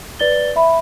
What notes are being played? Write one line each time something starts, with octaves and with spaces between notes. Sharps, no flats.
B4 D5 A6 G7
E5 B5